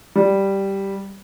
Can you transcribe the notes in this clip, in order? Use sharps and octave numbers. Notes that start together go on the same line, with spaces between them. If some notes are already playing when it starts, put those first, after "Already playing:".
G3